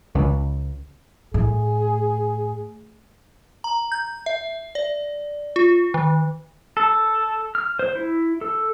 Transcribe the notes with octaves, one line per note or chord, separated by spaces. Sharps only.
C#2
A2 G#4
A#5
G6
E5
D5
F4
D#3
A4
F6
C5
E4
A4